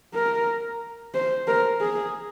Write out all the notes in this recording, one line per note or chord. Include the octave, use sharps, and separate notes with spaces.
A#4
C5
A#4
G#4